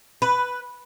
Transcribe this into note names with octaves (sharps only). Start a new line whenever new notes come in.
B4